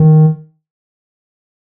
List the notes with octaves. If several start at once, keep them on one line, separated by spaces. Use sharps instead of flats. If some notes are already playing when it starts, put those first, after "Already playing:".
Already playing: D#3